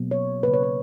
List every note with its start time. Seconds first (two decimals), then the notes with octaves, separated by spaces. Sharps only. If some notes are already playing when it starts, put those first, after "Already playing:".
Already playing: B2 F#3 A#3
0.11 C#5
0.43 C#3 F#3 A#3 B4
0.54 C#5
0.63 B4